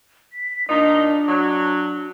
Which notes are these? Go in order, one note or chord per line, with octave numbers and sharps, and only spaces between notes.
B6
A#2 D4 D#4
F#3